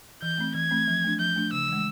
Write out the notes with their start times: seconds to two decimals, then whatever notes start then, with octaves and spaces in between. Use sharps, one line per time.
0.22 E3 G6
0.38 A3 C4
0.55 E3 G#6
0.71 A3 C4
0.88 F3
1.04 A3 D4
1.20 F3 G6
1.36 A3 D4
1.52 C#3 E6
1.69 E3 G#3